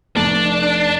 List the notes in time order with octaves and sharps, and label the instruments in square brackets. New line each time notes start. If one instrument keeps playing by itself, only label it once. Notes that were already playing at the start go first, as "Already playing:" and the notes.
[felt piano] F1 A3 A5 [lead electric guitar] D4